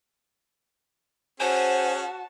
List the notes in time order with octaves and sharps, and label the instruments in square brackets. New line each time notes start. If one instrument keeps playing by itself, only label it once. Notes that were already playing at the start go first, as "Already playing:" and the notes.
[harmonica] C#4 G#4 [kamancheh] F#4 A5 [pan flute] C5 [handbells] G#5